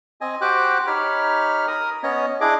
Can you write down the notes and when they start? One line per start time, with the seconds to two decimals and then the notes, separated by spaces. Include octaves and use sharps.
0.21 C4 D#5 G#5
0.41 F#4 G4 C5 G5 D6 F#6
0.87 D#4 G4 C#5 B5 F6
1.68 A#4 D#6
2.03 B3 C#4 C#5 D#5
2.41 D4 E4 G#4 D#5 D6